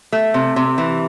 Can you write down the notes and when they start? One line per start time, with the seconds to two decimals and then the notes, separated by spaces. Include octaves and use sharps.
0.12 A3
0.34 C3
0.56 C3
0.78 E3